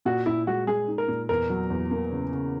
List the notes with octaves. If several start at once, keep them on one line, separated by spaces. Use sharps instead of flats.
A#2 F#4
A#2 E4
G#3 F#4
G#3 G#4
D#4
A#4
A#2
E2 A#4
F#3
E2
A#3
C#3
C#3